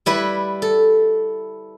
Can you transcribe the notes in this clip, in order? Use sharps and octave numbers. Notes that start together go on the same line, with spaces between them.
G3 E4 B4
A4